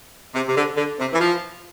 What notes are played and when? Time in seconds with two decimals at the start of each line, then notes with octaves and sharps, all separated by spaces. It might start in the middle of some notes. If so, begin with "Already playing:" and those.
0.35 C3
0.48 C3
0.56 D3
0.77 D3
0.99 C3
1.13 E3
1.20 F3